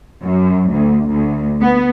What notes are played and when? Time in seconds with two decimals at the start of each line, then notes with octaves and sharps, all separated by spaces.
0.23 F#2
0.70 D2
1.10 D2
1.60 B3